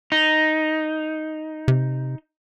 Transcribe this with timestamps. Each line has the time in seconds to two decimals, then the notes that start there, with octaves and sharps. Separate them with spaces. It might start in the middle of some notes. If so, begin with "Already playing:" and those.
0.12 D#4
1.68 C3